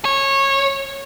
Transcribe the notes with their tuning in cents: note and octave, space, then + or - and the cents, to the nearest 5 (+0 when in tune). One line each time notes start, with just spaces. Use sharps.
C#5 -20